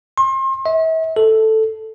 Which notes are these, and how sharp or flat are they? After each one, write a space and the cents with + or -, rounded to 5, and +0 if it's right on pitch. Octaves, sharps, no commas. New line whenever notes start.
C6 +35
E5 -40
A4 +0